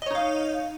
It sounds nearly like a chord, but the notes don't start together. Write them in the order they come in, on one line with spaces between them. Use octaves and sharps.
D#5 C#5 D#4 F5